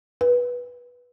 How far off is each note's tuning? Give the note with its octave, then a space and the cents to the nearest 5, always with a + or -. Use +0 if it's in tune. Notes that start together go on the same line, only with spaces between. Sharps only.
B4 -10